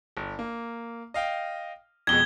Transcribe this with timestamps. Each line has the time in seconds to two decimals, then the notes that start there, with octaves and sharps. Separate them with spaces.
0.17 G1
0.39 A#3
1.14 D#5 F5 G5
2.07 F2 B2 G#3 G#6 G7